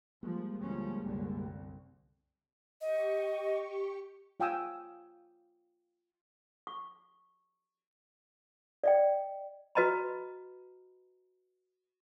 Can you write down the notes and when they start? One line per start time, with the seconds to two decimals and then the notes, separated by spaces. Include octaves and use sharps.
0.23 F3 G3 G#3 A#3
0.62 D2 F3 C#4
1.04 C2 F#2 D3
1.36 C2
2.81 G4 D#5 C#6
4.40 F4 F5 G5 G#5 D#6 E6
6.67 C#6
8.84 D5 D#5 G5
9.75 F#4 B4 D#5 A#5 B5